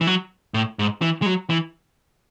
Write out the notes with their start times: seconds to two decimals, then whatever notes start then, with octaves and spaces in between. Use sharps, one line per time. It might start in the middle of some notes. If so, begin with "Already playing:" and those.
0.01 E3
0.07 F#3
0.54 A2
0.79 G#2
1.02 E3
1.22 G#3
1.26 F#3
1.50 E3